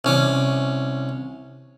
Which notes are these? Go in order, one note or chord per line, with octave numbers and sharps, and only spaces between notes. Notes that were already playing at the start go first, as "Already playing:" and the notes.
C2 C#4 D6